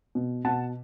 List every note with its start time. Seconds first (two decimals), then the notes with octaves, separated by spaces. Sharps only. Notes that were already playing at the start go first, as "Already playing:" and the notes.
0.15 B2
0.45 B2 F#5 A5